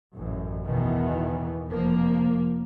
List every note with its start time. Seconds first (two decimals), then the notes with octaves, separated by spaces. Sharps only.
0.14 A1 F#2
0.66 E2 B2 D#3 E3 B3
1.68 F1 F3 A#3